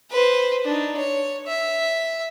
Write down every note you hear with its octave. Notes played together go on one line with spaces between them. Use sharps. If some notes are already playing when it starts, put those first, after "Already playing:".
B4 C5
D4 D#4
C#5
E5